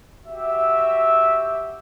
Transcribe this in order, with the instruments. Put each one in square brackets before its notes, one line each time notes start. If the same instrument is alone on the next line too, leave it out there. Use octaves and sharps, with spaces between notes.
[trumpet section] F#4 G4 E5